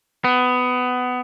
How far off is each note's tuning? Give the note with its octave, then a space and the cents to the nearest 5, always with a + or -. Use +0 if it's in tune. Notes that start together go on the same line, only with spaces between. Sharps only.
B3 +20